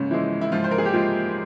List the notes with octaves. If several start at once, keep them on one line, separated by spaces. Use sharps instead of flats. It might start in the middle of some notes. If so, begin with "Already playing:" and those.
Already playing: G#2 C#3 C#4
E3 F3 G#3 E4
E4
G#2 F3 F4
C5
A#4
G#4
G4
F3 G#3 F4